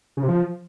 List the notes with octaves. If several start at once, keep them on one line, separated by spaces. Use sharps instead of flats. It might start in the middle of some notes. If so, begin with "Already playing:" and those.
C#3
C3
F3